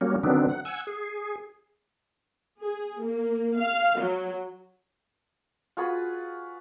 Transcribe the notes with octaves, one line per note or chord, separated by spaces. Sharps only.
F#3 G3 A#3 C#4
D3 D#3 F#3 B3 C4 D4
F#5
F#5 G#5 E6
G#4
G#4
A#3
F5
F#3
F4 F#4 G#4 B4